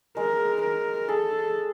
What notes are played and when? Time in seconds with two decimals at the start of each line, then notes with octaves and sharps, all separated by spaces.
0.17 G#3 A#4
0.63 A#4
1.08 G#4 A4